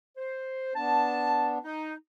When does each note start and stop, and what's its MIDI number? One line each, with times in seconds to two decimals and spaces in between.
0.17 0.75 72
0.75 1.58 59
0.75 1.58 62
0.75 1.51 81
1.64 1.94 63